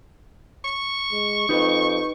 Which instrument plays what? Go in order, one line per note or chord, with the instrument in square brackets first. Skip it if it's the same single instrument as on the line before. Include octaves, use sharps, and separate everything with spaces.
[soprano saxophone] C#6
[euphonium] G#3
[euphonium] F2 [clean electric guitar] D#4 G4 B4